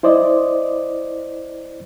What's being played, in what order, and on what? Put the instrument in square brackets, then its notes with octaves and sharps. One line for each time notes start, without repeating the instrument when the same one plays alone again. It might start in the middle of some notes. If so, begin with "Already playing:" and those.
[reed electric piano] E4 C5 D5 D#5